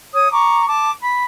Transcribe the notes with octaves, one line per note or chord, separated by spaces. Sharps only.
C#5 D#6
A#5 C#6 D6
A5 D6
B5